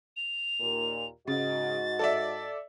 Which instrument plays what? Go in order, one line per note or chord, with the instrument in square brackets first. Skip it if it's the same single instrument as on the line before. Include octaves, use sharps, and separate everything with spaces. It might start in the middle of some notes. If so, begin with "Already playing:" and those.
[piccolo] F7
[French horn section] D#2 A#2 A#4
[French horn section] G#2 F#4 D#5 [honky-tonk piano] C#3 [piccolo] A6
[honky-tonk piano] A4 D5 E5